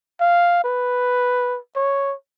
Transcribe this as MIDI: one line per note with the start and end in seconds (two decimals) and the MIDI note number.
0.21 0.62 77
0.64 1.59 71
1.76 2.14 73